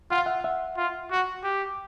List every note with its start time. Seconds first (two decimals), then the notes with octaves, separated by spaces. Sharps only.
0.11 F4 F#5
0.18 F5
0.26 E5 F#5
0.44 E5 F#5
0.77 F4
1.11 F#4
1.43 G4